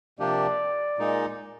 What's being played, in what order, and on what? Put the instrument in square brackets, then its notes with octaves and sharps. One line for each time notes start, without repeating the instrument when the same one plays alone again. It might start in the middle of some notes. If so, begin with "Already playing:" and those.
[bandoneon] C3 F3 A#3 D4 G4 [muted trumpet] D5
[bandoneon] A#2 G#3 D#4